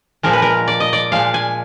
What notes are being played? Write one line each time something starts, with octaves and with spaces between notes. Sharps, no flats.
A#2 F3 G#3 A#4
B4
A#4
D5
D#5
D5
A#2 F3 G#3 F5
G#5